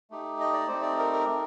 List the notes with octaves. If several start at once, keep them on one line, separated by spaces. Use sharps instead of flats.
A3 D#4 G4
D#5
D5
A3 C4 D#4 G4 C5
D5
A#4
A#4
A3 D#4 G4